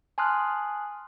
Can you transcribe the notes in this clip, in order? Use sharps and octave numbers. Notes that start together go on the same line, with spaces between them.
G#5 A5 C6 D#6 F6 F#6